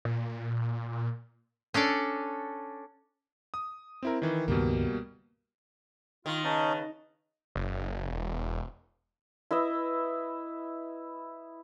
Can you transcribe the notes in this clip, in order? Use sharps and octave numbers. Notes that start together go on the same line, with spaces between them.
A#2
C#4 D4 A4 D5
D#6
C4 E4 A#4
D#3 E3
C#2 G2 B2 D#3 G3 A#3
D#3 F4
C#3 C#4 D#4 B4 A5
F#1
E1
E4 B4 D#5 E5